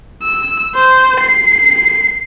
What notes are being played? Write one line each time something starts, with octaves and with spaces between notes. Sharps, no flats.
E6
C5
C7